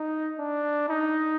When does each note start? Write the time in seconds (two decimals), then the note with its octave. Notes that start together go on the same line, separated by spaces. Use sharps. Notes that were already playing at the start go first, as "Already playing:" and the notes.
Already playing: D#4
0.39 D4
0.89 D#4